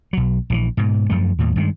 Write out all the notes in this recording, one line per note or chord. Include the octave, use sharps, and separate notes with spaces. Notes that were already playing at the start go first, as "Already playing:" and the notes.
B1 F#3
A#1 D3 E3
G#2 B2
F#2 F3 A3
D#2 A2
G2 D#3 F#3 G#3